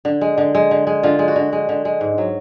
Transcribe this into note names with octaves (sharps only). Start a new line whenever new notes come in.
D3
G#3
D3
G#3
D3
G#3
D3 F4
G#3
F#4
D3
G#3
D3
G#3
G#2
F#3